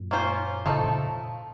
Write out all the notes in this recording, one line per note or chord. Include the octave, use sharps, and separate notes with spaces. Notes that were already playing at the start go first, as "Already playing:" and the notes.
Already playing: F#2 A#2
A#3 C#4 F4 C5
A#2 C#3 F3 A3 D#4 A4
A#2 C#3